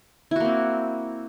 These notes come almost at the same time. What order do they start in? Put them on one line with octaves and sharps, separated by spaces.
E4 F#4 A#3 C4